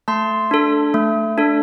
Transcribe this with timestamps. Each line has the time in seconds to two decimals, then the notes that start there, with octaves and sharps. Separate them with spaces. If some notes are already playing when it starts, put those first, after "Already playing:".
0.08 A3 A5 C6
0.51 D4 A4
0.94 A3
1.38 D4 A4